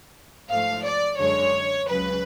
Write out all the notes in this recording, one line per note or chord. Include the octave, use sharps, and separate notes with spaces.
G#2 F3 A3 F5
D5
F#2 D3 G#3 C#5
C#2 C#3 F#3 B4